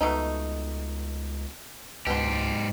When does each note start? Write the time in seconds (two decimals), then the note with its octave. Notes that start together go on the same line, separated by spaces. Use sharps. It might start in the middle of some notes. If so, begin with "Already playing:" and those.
0.01 C#2 B2 A3 D#4
2.07 C#2 G#2 B2 G4 C6